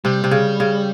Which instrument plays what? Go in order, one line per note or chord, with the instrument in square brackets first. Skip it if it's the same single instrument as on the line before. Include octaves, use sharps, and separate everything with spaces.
[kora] C3 [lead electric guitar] G3
[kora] C3
C#3
C#3